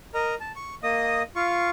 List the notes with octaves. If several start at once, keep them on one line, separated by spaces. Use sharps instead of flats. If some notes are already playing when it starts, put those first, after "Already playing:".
A#4 D#5 A#5
A5
C#6
A#3 D#5 D#6
F4 F5 C#6